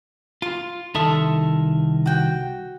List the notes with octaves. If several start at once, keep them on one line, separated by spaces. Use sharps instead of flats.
F4 C6
C2 D#3 A4 E5 C6 D#6
F#4 G5